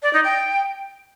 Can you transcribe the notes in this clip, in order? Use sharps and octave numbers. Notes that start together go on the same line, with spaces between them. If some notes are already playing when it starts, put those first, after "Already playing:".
D5
D#4
G5